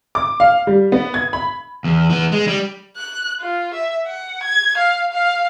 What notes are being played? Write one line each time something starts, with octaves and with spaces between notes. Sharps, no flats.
D6
F5
G3
B3
G#6
B5
E2
E3 B3
G#3
G3
F#6
F4
E5
F#5
G#6
F5
F5